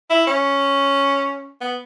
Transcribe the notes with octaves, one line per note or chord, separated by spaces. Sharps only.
E4
C#4
B3